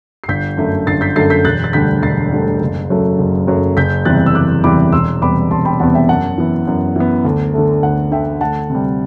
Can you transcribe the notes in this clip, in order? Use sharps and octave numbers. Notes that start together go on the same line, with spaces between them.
C7
G1 G6 B6
F#2 D3 A3
G1 A6 C7
G6 B6
F#2 D3 A3 A6 C7
G6 B6
E1 F#6 A6
A6
D2 D3 G3 G6 B6
E1 A6 C7
D2 D3 G3
F#1
F#2 F#3 A3
F#1
F#2 F#3 A3
F#1 G6 B6
E2 C3 E3 G3 F#6 A6
E6
F#1 D6 F#6
E2 C3 E3 G3 B5 D6
E1 C6 E6
E2 C3 G3 B3 B5 D6
E1 A5 C6
G5 B5
E2 C3 G3 B3 F#5 A5
E5 G5
F#2 F#5 A5
E3 B3
F#2
E3 B3
D2
D3 A3
D2 F#5
D3 A3 E5 G5
D2 F#5 A5
C3 G3